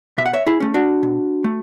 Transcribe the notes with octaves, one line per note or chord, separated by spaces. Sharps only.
B2 E5
F#5
C#5 E5
E4 G#4
A3 C#4
D4 F#4
B2
A3